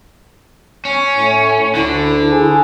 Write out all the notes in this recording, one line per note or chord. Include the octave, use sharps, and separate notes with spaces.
C#4
A2
D2 D3 E4
G#4